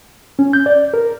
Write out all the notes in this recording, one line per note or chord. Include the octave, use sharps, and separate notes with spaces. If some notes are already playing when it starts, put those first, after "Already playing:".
C#4
G6
D5
A#4